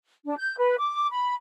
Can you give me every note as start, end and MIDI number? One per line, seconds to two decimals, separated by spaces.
0.25 0.37 62
0.38 0.55 91
0.58 0.75 71
0.78 1.07 86
1.11 1.34 83